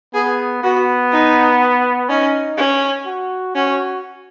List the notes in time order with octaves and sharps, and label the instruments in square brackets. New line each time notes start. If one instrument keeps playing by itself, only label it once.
[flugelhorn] B3 [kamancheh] G#4
[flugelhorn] B3 [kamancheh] F#4
[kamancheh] D#4
[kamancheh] C#4 [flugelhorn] D#4
[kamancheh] C#4
[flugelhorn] F#4
[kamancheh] C#4 [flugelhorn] F#4